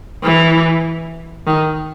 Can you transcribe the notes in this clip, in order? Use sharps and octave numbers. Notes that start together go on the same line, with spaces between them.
E3
D#3